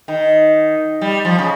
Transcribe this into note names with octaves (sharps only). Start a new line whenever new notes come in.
D#3
G3
F3
C#3